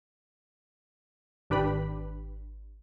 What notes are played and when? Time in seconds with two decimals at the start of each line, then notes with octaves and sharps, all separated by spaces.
1.50 G#1 D4 G4 B4 B5